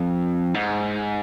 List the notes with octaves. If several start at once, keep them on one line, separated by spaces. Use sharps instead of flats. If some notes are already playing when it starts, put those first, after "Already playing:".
Already playing: F2
G#2